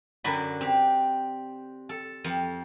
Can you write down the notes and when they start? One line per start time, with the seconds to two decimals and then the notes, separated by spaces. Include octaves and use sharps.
0.24 F#2 D3 F#3 D4 B5
0.61 C4 G4
1.89 A4
2.24 F2